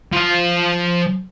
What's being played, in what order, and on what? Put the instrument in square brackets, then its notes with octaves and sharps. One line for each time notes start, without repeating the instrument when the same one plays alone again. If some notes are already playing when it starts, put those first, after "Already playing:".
[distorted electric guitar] F3 F5